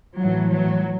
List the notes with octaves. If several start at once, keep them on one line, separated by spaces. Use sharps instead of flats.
A2 E3 F#3
F#3